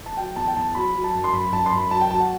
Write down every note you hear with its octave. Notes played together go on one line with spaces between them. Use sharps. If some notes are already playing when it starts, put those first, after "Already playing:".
A5
F#3 G5
E2 A5
G5
E2 A5
F#3 B5
F#3
A5
F#2
C6
F#2 B5
F#2 A5
C6
F#2 B5
F#3 A5
G5
F#3 A5
F#5